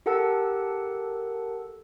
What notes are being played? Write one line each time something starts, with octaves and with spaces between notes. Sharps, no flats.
G4 A4 A#4 F#5 A5 E6